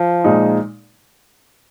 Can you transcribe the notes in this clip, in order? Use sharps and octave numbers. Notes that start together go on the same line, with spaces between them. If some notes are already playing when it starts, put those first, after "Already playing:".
Already playing: F3
A#2 G#3 D#4